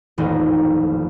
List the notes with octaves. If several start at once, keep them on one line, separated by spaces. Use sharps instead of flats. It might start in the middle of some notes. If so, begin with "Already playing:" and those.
D#1 A1 F2 D#4 A#6